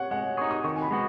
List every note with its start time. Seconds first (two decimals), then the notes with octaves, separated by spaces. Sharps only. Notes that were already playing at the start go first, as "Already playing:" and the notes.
Already playing: C#5 F#5
0.11 G#3 F#5
0.37 G#4 C#6
0.41 D#4
0.51 D#6
0.64 D#3 C#6
0.76 G#5
0.82 B5
0.91 G#3 B3 F#4